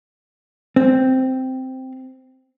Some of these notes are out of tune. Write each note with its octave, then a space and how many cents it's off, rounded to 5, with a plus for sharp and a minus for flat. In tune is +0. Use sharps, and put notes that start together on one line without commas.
C4 -5